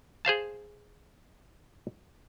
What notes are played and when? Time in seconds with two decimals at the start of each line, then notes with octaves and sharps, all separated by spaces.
0.25 G#4 C5 F5 A5